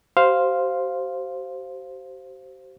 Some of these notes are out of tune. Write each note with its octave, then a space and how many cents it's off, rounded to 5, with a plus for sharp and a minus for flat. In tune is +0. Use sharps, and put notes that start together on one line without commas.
G4 -45 C5 +0 F5 +0